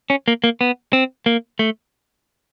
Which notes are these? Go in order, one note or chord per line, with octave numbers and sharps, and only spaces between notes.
C#4
A#3
A#3
B3
C4
A#3
A3